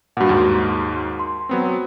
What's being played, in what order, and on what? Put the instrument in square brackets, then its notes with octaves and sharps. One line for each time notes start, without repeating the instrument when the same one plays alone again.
[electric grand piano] G2 A#2 [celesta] F#4 F#5
[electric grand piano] D#2 G#2
[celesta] C6
[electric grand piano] F#3 B3 C4